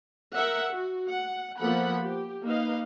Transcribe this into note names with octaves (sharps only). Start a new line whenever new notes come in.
A#4 E5 F#5
F#4
F#5
F3 A#3 B3 A4 F#5 B5
G4
A#3 D#4 B4 D#5 F5